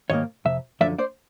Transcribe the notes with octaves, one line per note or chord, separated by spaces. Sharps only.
G#2 D#3 G3 A#3 C#5 D#5
F2 C3 E5
F#2 D3 F3 D5 E5
C5 D5